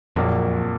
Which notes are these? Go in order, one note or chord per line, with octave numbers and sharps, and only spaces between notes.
A#1 F2 A#2 F#3 A#3